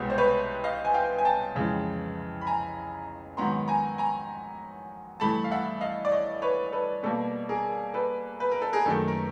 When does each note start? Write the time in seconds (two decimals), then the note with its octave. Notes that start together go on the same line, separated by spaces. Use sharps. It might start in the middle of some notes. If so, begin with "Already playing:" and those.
Already playing: C2 B2 G#3 B3 C#5
0.10 C5
0.18 B4 C#5
0.64 D#5 F5
0.85 G#5
0.94 F5 G5
1.18 G#5
1.25 G5 A5
1.55 F2 C#3 E3 G#3
2.41 B5
2.47 G#5 A#5
3.37 G#2 D#3 F#3 B3 A#5 C6
3.68 G#5 A#5
3.98 G#5 A#5
5.20 G2 E3 A3 A5 B5
5.44 F5
5.51 E5 F#5
5.81 D#5 F5
6.05 D5
6.12 C#5 D#5
6.42 B4 C#5
6.72 A4 B4
7.03 B2 G3 A#3 A4
7.49 G#4 A#4
7.94 A4 B4
8.40 B4
8.52 A#4
8.62 A4
8.73 G#4 A#4
8.86 F#2 D#3 F#3 A3 A4
9.08 A#4